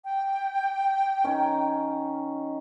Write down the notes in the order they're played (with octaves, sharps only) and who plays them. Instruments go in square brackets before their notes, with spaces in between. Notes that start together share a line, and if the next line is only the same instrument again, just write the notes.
[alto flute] G5
[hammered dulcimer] D#3 C#4